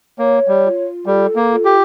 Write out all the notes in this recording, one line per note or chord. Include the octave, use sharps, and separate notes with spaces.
A#3 C#5
G3
F4
G3 A4
A#3
F4
G4